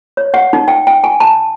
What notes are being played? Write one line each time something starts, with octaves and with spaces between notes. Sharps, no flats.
C#5
F#5
D#4
G5
G5
G#5
A5